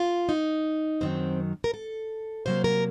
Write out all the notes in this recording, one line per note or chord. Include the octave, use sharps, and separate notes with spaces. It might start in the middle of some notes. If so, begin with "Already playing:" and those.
Already playing: F4
D#4
F#2 D#3 F#3 C4
A#4
A4
C3 F#3 A#3 C5
A#4